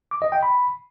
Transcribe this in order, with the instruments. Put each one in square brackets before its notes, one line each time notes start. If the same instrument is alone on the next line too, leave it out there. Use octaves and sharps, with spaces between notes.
[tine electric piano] D6
D#5
G5
B5